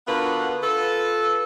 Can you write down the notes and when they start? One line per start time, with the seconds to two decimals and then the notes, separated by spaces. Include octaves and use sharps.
0.08 D3 B3 F4 F#4 A#4 B4
0.62 F4 A4 B4